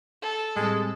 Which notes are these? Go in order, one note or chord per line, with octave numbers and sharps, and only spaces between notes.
A4
A2 G3 G#3 C4